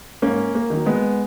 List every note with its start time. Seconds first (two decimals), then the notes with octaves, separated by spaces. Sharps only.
0.22 G#2 A#3 C#4
0.55 A#3
0.70 D#3 F#3
0.86 G#3 B3